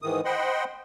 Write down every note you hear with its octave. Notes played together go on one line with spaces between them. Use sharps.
G#2 D#3 E3 D#6
C5 D#5 F#5 G5 B5 C6